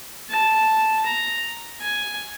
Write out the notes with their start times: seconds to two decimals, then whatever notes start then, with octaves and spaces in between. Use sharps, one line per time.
0.30 A5
1.06 A#5
1.82 G#5